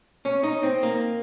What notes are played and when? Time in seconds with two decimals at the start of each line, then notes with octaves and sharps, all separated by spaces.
0.25 C#4
0.43 D#4
0.63 C4
0.83 A#3